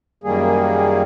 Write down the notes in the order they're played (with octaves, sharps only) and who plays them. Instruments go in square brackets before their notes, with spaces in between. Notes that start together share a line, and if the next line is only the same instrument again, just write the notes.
[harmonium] F#2 D#3 G3 A#3 G#4